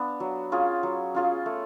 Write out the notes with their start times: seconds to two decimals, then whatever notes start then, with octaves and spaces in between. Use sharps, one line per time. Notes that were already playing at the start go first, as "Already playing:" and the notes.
Already playing: B3 D4
0.20 F#3
0.52 C#4 F4 G#4
0.83 F#3
1.14 C#4 F4 G#4
1.46 A3